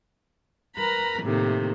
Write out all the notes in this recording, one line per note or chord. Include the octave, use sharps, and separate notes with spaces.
A#4 B4 A#5 B5
A2 C3 D#3 A3 A#3